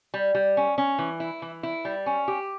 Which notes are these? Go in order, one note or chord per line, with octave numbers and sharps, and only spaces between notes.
G3
G3
C#4
C#4
E3
E4
E3
E4
G3
C#4
G4